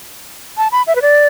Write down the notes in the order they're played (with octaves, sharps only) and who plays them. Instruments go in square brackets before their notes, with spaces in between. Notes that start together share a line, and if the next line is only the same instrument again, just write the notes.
[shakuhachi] A5
B5
E5
B4
D5